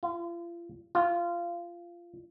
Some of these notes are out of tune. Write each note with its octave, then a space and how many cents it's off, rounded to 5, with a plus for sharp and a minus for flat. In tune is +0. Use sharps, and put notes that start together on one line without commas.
F4 -35
F4 -15